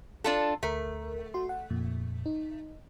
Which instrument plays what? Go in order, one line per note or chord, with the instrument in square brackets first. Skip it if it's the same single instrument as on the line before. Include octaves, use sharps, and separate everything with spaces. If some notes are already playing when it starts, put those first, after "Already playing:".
[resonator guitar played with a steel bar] D4 F4 A4
[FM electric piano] D2 A#4 [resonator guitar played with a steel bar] A3
[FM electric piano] F#4 C6
F#5
F2 A#2
D#4